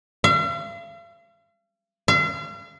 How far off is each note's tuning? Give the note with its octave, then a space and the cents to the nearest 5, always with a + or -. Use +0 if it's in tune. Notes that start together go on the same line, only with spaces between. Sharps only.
F5 -45
F5 -40